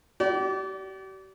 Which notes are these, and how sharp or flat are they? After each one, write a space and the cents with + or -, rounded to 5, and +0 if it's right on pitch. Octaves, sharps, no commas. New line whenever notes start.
G4 -45 D5 -25